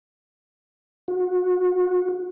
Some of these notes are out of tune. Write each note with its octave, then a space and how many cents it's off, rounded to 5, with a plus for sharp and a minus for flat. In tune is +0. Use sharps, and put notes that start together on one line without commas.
F#4 -30